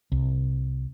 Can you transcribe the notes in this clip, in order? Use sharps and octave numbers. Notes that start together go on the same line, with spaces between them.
C2